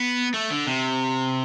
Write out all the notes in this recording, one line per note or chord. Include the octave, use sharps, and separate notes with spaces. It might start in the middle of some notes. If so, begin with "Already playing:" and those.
Already playing: B3
A3
D3
C3